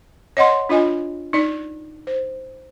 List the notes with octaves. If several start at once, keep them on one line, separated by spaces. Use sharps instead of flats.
C#5 D#5 F#5 C6
D4 F4 D#5 G#5
D#4 D5
C5